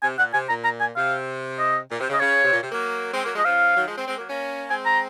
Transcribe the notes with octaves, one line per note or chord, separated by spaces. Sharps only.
C3 G#5
A#2 F#5
C3 G#5
A#2 A#5
A#5
G#5
C3 F5
D#5
A#2
C3
C#3
D#5
C#3 C#5
C3
A#2
C3
F#3 A#3
G#3 C4
F#3 A#3
F3 G#3 D#5
C#3 F3 F5
D#3 F#3
F3 G#3
G#3 C4
G#3 C4
F#3 A#3
A#3 C#4
G#3 C4 G#5
A#5